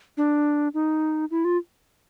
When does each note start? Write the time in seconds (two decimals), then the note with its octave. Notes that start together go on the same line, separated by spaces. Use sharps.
0.17 D4
0.74 D#4
1.31 E4
1.45 F4